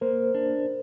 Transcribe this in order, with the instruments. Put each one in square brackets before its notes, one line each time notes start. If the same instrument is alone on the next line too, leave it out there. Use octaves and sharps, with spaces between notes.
[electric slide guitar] A#3 [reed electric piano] A#4 C5
[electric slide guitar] D4